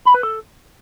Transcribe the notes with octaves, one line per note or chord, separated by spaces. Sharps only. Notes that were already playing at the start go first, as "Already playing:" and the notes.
B5
B4
A4